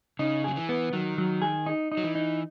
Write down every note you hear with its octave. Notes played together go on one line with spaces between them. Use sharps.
C#3 D#4
F#3 G#4
E3
B3
D#3 F#3
F#3
G#4
D#4
D#4
F#3
E3
D#4